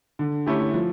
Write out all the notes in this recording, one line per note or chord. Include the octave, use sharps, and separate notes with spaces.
D3
A3 C#4 E4 G4
F3